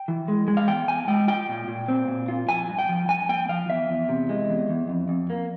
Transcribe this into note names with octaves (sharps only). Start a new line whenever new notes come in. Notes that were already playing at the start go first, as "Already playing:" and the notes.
Already playing: G5
E3
G#3
G#3
F5
E2 G5
E2 G#5
G#3 G5
F4 G5
A#2
A#2
C4
A#2
F4
F3 G#5
G2
G5
F3
G2 G#5
A#3 G5
F3 F5
E2 E5
E2
C3
G#3
E2
E2
F2
F2
A#3